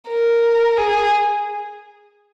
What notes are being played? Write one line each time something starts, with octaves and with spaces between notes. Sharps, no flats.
A#4
G#4